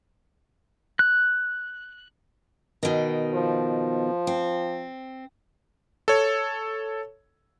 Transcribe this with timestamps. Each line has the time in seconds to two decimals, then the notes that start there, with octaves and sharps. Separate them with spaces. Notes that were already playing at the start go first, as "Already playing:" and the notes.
0.99 F#6
2.83 B2 D#3
3.34 F3
4.27 C4
6.08 A4 C#5